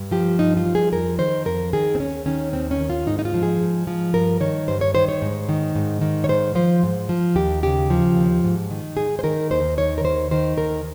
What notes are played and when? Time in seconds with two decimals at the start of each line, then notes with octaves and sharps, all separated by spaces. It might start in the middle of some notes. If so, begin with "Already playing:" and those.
Already playing: G2
0.11 F3 G4
0.38 G2 D#4
0.57 F4
0.65 F3
0.75 G#4
0.93 F2 A#4
1.19 D#3 C5
1.45 F2 A#4
1.73 D#3 G#4
1.95 C4
2.00 D#2 C#4
2.26 D#3 C#4
2.53 D#2 C4
2.71 C#4
2.80 D#3
2.90 F4
3.07 G#2 D#4
3.19 D#4
3.25 F4
3.34 F3
3.43 G#4
3.61 G#2
3.87 F3
4.14 G2 A#4
4.40 D#3 C#5
4.68 G2 C5
4.81 C#5
4.94 D#3 C5
5.09 C#5
5.22 G#2
5.49 D#3
5.75 G#2
6.01 D#3
6.24 C#5
6.29 G#2 C5
6.55 F3 C5
6.83 G#2
7.09 F3
7.36 D#2 G4
7.63 C#3 G4
7.90 F3
8.16 D#2
8.44 G#2
8.70 D#3
8.97 G#2 G#4
9.19 C5
9.23 D#3 A#4
9.51 D#2 C5
9.77 D#3 C#5
9.98 A#4
10.04 D#2 C5
10.31 D#3 C5
10.58 D#2 A#4